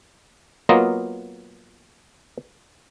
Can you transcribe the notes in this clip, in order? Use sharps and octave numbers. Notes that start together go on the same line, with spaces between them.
F#3 A#3 B3 F4 D#5 F5